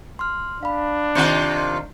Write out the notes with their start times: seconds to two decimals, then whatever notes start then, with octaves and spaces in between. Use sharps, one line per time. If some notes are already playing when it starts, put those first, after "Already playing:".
0.19 C6 F6
0.63 D4 F5 B5
1.15 C3 D#3 F4 C6 G6 C#7